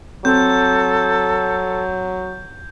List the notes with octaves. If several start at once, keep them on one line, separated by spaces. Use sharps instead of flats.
F#3 C4 A4 G6